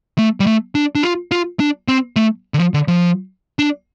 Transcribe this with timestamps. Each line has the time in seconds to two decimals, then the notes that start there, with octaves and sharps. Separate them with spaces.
0.18 A3
0.40 G3
0.47 A3
0.75 D4
0.95 D4
1.03 F4
1.32 F4
1.60 D4
1.88 C4
2.16 A3
2.54 D3
2.59 F3
2.74 D3
2.88 F3
3.59 D4